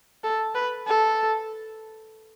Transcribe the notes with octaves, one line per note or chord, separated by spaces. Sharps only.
A4
B4
A4